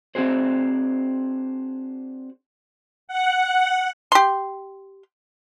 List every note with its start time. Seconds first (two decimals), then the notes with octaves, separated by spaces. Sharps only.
0.15 C4 D4 F#4 G#4 C5
3.08 F#5
4.12 G4 C6